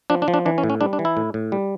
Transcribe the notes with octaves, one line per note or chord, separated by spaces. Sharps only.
F3 D4
D4
F3
D4
E3 D4
C#4
A2
C#4
G3 D4
D4
E3
E4
A2
A2
G3